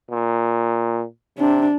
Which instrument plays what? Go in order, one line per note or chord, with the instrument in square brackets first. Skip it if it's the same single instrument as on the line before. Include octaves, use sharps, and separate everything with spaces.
[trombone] A#2
[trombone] C3 [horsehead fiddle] D4